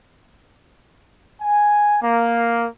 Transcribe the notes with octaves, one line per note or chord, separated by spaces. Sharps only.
G#5
A#3